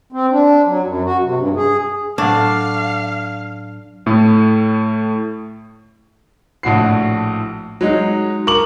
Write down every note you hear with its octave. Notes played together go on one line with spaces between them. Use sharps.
C4
D4
F#3
F#2
F#4
C3
G2
G#4
A2 F#3 D4 F5 A5
A2 A3
A#1 A2 F#4 C7
F#3 G#3 D#4
A#4 C#6 D6 F#7